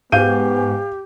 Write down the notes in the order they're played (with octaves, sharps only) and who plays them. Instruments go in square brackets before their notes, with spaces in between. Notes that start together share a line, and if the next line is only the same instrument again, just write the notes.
[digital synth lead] G#2 [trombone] B3 [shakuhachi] G4 [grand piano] F5 G6 D#7